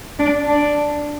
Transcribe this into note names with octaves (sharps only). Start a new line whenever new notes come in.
D4
D4